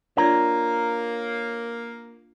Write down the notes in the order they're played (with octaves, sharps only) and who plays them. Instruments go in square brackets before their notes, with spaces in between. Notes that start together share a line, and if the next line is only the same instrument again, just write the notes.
[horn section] A#3 [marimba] D4 F4 D5 [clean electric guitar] C#5 A#5